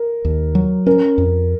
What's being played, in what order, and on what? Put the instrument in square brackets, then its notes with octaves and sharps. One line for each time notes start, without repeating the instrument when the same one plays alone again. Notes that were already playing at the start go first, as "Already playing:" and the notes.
Already playing: [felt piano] A#4
[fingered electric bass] D#2
F#3
[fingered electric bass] C#4 [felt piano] A#4
[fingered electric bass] F2